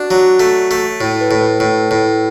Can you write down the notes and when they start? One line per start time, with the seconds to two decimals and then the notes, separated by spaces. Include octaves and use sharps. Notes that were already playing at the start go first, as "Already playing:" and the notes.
Already playing: D4 F#4
0.11 F#3
0.40 A3
0.71 A3
1.01 A2 A4
1.21 B4
1.31 A2
1.41 B4
1.60 A2 A4
1.91 A2